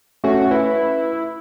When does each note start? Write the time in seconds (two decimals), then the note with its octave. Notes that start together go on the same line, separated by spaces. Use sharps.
0.24 A3 C#4 F#4
0.51 E4 B4